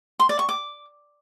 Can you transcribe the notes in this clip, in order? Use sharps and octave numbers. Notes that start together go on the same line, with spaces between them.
C6
D5
C#6
D6